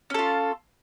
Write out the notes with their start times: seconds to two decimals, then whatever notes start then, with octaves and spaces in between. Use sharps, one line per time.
0.10 C#4
0.14 A4
0.19 F4